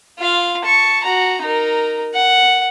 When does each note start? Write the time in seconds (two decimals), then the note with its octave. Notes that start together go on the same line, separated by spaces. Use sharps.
0.19 F4 F5
0.64 A5 C#6
1.04 F#4 A#5
1.42 D#4 A#4
2.15 F#5